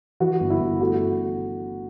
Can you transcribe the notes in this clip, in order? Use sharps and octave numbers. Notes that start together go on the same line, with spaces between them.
E3 F#4
G1
E4
G1
A3 F#4